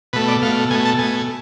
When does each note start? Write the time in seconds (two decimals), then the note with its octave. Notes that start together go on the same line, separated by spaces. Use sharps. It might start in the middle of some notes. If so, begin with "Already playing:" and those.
0.13 B2 A3 B4
0.28 D5
0.42 B2 A3 F5
0.70 B2 G#5
0.73 A3
0.85 A5
0.99 B2 A3 G#5